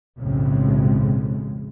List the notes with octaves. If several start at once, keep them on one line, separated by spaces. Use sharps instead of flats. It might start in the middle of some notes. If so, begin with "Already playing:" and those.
B1 F2 A2 C#3 G#3